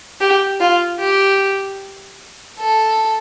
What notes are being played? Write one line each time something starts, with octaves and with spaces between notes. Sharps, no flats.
G4
F4
G4
A4